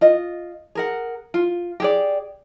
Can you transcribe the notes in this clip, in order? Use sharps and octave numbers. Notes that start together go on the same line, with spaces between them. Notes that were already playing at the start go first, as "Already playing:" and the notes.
F4 D#5
G#4 A#4 F#5
F4
G4 G#4 D5